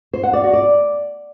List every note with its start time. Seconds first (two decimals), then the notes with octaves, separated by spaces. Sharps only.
0.13 C5
0.23 F#5
0.33 D5
0.43 F#4
0.53 D5